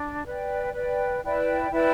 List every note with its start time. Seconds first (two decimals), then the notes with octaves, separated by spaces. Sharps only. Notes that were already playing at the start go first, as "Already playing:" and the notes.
Already playing: D4
0.25 B4 D5 G5
0.74 B4 D5 G5
1.22 E4 B4 D5 G5
1.71 E4 B4 D5 G5